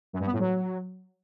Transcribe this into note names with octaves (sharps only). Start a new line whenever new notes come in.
F#2
G2
B3
A2
F#3